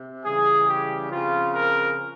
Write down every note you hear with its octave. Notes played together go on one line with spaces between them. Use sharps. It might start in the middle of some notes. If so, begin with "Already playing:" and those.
Already playing: C3
C#3 E3 G3 G#4
G4
C#3 F3 C4 F4
A#4